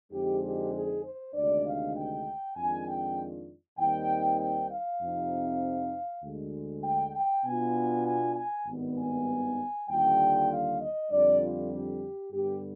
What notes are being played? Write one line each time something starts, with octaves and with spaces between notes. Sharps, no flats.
F2 D3 G#3 C4 D#4 G4
G4
G#4
C5
D2 C3 D#3 G#3 D4 D5
F5
G5
F2 D#3 G#3 D4 F4 G#5
G5
D#2 D#3 G3 C4 D#4 G5
G5
F5
F2 C3 F3 C4 D#4
D2 D3 G#3
G5
G5
B2 B3 D4 F4 G#5
G#5
G#5
G#1 G2 D#3 G3 B3
G#5
D#2 D3 G3 D4 F4 G5
F5
D#5
F2 D3 G3 D4 D5
F4
G4
G2 D3 G3 B3 G4